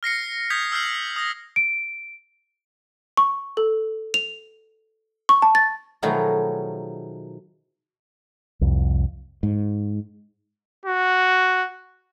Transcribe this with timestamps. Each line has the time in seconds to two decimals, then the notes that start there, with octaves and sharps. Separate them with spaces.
0.03 F6 A#6 C7 C#7
0.50 D#6 G6 G#6 A#6 B6
0.72 E6 F6 G6 C7 F#7
1.16 D#6 A#6
1.56 D7
3.17 C#6
3.57 A4
4.14 F7
5.29 C#6
5.42 A5
5.55 A6
6.02 B2 D#3 F3 F#3 A3 G#4
8.61 C2 F2
9.43 G#2
10.86 F#4